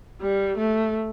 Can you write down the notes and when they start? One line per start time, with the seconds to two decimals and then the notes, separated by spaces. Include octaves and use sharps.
0.22 G3
0.58 A3